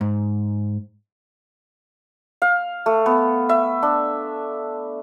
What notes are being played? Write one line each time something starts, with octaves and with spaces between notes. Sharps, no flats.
G#2
F5
A3
B3
E5
D4